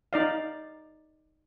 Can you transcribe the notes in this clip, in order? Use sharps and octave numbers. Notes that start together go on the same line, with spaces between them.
D#4 D5 F5